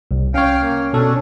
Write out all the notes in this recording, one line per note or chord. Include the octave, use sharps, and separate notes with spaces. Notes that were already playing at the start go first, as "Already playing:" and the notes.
C2
C#4 C#5 F5 G5
A#3
B2 C#4 D4 A4